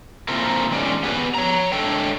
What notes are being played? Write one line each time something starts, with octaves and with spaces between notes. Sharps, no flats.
A3 A#3 C4 E4 F4 A#4
E2 D#3 G#3 C#4 D5
B3 G4 G#4 B4
C#5 A#5
G#3 A3 D4 A4 C#5 G5